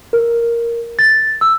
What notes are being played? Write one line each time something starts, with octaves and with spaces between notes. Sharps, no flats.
A#4
A6
E6